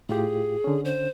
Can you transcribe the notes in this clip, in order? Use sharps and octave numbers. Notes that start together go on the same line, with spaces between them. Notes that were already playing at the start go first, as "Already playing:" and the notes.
A2 F4 G4 G#4
D3 C#4
C5